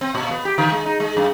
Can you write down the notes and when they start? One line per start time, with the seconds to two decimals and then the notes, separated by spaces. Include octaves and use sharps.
0.01 C4
0.15 A#2
0.31 B3
0.45 G4
0.58 D3
0.72 G#3
0.86 D#4
1.00 G#3
1.17 F#2